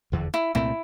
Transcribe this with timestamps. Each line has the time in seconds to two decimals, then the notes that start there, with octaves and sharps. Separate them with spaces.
0.12 F1 E2 D3
0.34 E4
0.55 C2 A#2 A3 C4 E4